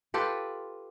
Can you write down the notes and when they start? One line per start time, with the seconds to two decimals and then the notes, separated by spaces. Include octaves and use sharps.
0.14 F4 G4 A4 B4